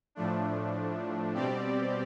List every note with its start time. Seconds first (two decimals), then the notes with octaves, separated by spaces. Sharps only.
0.15 A2 F3 A3 D4
1.34 B2 G3 C4 G4 D5